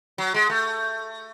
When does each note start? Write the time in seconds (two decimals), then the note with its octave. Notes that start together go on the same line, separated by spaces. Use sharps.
0.18 F#3
0.34 G#3
0.50 A3